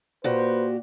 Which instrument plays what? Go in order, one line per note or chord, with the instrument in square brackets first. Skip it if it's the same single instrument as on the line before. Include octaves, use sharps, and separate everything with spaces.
[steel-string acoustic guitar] A#2 F#4 G4 [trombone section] B4 C5